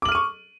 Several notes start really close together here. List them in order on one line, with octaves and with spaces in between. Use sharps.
D6 F#7 F6 D#7 C#6